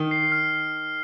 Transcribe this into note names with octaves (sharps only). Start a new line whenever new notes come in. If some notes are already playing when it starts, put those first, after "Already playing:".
Already playing: D#3 F6
C7
F6